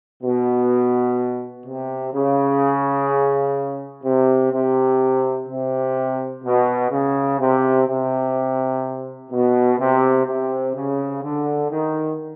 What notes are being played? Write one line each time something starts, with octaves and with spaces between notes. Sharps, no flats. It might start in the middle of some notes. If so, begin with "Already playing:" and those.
B2
C3
C#3
C3
C3
C3
B2
C#3
C3
C3
B2
C3
C3
C#3
D3
D#3